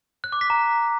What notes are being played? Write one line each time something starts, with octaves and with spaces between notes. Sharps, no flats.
F#6
D6
B6
A#5